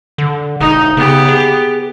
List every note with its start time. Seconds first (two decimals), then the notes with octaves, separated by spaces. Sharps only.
0.18 D3
0.61 E1 D#4
0.97 C#3 B3 G4
1.28 G#4